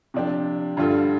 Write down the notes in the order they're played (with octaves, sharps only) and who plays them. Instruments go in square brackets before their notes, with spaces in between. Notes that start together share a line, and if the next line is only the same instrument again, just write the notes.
[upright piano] C3 F3 D4 G4
G2 D3 G3 F4 A4